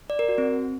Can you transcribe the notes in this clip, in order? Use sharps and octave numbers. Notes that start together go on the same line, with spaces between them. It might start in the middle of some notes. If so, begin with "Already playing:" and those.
D5
A#4
F#4
C4